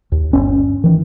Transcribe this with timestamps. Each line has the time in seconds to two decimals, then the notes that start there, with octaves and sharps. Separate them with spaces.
0.12 D#2
0.33 G1 C#4
0.84 D#3 E3